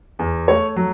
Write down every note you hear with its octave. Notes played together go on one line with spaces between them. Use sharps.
E2
A3 C#5
F#3